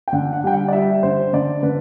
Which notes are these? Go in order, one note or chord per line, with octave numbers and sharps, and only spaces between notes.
G5
D3 F#5
F#5
G3 G5
F#5
D5
G3 E5
D3 C5
D3 D5
D3 B4